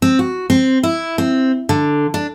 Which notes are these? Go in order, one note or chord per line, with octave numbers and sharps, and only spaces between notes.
C4
F#4
C4
E4
C4
D3
D4